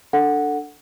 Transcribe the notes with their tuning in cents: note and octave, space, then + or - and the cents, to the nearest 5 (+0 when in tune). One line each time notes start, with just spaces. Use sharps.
D4 +0 A4 +15 F#5 -5